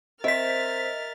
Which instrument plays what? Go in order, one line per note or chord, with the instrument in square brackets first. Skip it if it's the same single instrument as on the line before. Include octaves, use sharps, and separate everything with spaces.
[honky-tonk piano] C4 C5 [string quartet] A#4 F6 A6 [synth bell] D#5 B6 [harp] E5